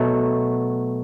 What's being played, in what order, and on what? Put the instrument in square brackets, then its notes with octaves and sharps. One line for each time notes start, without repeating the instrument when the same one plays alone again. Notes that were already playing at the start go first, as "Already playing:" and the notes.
Already playing: [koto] B2 F#3 A3